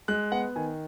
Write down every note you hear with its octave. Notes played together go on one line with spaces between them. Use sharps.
G#3 F#6
B3 F#5
D#3 G#5